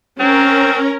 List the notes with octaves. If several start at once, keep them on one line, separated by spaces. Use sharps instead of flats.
C4 C#4 A#4